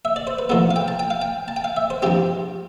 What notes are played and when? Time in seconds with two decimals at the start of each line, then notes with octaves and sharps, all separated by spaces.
0.05 E5
0.16 D5
0.27 C5
0.39 B4
0.49 A2 F3 B3 A4
0.71 F5
0.76 G5
0.88 A5
0.99 G5
1.10 F5
1.22 G5
1.48 A5
1.56 G5
1.64 F5
1.77 E5
1.90 C5
2.02 G2 F3 C4 G4